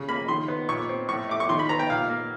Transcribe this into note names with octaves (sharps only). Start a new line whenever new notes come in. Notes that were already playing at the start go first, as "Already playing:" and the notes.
Already playing: C#3
A#3 B5
D#3 C6
B3
A#2 C#6
C4
A2 C#6
A3 D6
C#6
D#3 C6
B5
B3 A#5
G5
A#2 F5
A#3